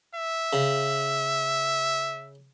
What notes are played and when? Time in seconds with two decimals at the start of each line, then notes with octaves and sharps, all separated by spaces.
0.15 E5
0.53 C#3